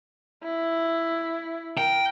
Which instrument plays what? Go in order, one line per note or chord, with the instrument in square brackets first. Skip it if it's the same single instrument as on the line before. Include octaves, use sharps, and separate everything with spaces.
[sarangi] E4
[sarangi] A#4 [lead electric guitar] G5